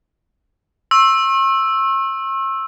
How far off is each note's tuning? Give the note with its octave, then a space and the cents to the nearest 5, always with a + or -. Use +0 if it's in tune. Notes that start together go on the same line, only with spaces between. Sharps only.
C#6 -45 E6 +0